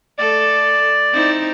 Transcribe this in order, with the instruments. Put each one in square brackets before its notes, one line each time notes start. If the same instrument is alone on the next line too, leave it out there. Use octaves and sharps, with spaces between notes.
[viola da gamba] A3 A4 [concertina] D5
[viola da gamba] C4 D#4 E4